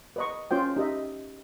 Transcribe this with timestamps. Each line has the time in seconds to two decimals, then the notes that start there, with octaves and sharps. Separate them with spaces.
0.16 B4 D#5 C#6
0.51 C#4 F4 C5 G5
0.76 D#4 G4 D#5 E5